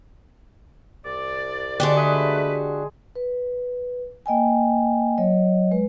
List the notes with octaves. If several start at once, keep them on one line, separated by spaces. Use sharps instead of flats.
C2 D5
D3 G#3 D4 F#4 G4 F#5
A3 G#4 B4
B4
A#3 D#5 G5 G#5
F#3 C#5 D#5
G#3 B4